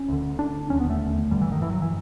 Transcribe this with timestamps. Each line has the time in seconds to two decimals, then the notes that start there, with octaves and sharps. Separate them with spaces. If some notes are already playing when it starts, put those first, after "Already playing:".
Already playing: C#4
0.08 D2 D3
0.39 D4
0.70 E1 D#2 D3 C#4
0.80 B3
0.90 A3
1.31 G1 G2 D3 G3
1.41 E3
1.52 D#3
1.62 E3
1.71 F#3
1.82 E3